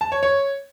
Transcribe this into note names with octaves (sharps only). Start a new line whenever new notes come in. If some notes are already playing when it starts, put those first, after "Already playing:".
A5
C#5
C#5